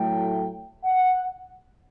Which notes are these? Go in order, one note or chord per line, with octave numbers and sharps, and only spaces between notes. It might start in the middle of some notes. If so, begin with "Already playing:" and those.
Already playing: A2 F#3 A3 G5
F#5